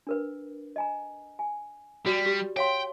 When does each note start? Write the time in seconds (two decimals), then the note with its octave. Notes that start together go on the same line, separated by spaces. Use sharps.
0.07 D4 A#4 B4
0.76 D#5 G#5 A#5
1.39 G#5
2.06 G3 F#4 D5
2.26 G4
2.57 C#5 F5 G5 C6